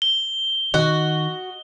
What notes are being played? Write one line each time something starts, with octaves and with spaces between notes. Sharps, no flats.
G7
D#3 F#4 D#5